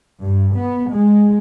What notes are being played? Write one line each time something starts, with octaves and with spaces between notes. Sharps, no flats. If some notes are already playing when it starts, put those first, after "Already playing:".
G2
B3
G#3